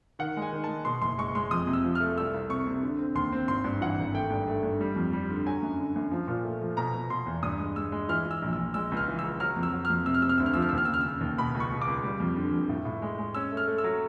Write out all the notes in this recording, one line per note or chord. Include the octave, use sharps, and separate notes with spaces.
D#3 F#5
G#3
G#5
D#3
G#3 A5
B2 C6
F#1 C6
G#3 C#6
G#3 C6
F2 D#6
C3
E6
F3
F6
A3
C2 E6
C2
C3 C#6
C3
D3
C4
D#2 C6
C4
G#1 C6
G2
E3 F#5
G#1
A3 G5
G2
A3
G2
G3
F2
G3
D3
F#3 G#5
F#2
D3
F#2
F3
A#2
A3
F3
B2 A#5
B2
B2 C6
E2
G2 D#6
G#3
G#3 E6
G#3
E3 F6
E3
E6
A#1
E6
A#1
G#3 E6
C#2
F6
E3
C#2 E6
F#3 F6
F2
E6
F#3
F6
F2
C3 E6
F6
C3 E6
F6
D2 E6
F6
F3 E6
F6
E6
D#2
F6
E6
C#3
F6
C#3 E6
D#2
B2 B5
C#2
C#6
B2
D6
C#2
G3
F2
D3
F2
A2
A2
G#3
G#3
C#4 E6
A3
F6
A3
E6
F#3